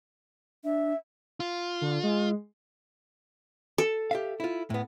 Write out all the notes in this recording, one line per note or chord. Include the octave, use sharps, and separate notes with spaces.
D4 E5
F4
D3
G#3
A4
G4 E5 F5
E4 F4
A2 B3